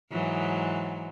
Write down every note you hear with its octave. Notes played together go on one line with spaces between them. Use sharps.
G#2 E3 F#3